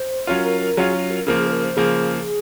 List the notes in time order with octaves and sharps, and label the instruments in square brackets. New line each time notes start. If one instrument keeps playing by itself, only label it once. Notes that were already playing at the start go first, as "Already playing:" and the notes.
Already playing: [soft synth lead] C5
[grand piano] F#3 C#4 F4 [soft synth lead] A#4
[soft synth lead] A#4
A#4
[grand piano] F#3 C#4 F4 [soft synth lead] G#4
[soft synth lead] F#4
A#4
[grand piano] C#3 F3 A#3 [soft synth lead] A#4
[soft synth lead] G#4
C5
A#4
C5
[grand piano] C#3 F3 A#3 [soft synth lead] G#4